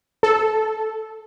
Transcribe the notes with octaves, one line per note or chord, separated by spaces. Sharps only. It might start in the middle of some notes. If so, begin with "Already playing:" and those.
A4